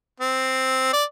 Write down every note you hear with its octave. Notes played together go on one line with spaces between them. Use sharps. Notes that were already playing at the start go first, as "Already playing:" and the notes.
C4
D5